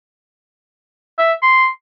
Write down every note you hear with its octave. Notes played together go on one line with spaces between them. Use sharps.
E5
C6